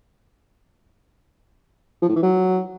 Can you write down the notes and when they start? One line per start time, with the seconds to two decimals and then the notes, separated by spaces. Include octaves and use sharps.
2.02 F3
2.09 A2
2.16 E3
2.23 F#3